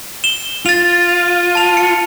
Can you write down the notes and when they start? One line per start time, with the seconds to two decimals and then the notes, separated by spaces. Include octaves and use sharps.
0.24 E7 G7
0.66 F4 A6 F7
1.55 A5 F7
1.77 C#7